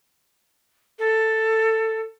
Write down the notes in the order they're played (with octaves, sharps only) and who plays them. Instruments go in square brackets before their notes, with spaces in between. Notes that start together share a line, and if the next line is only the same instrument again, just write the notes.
[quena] A4